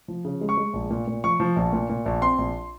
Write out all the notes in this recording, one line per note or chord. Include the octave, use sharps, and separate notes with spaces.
F3
C#3
G#3
C#6
G#3
A#1
A#2
A#2
F3 C#6
F3
A#1
A#2
A#2
A#1
C4 C6
A#1